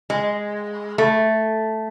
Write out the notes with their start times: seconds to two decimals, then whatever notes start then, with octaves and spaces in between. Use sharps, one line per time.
0.10 G#3
0.98 A3